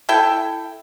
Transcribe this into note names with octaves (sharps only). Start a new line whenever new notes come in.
E4 A4 G5